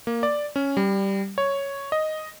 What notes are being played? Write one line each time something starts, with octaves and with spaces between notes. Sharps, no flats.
A#3
D5
C#4
G3
C#5
D#5